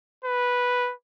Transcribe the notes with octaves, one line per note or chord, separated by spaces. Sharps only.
B4